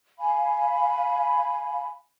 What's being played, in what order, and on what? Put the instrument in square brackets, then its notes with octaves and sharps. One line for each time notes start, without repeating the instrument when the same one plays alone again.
[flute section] F5 G#5 B5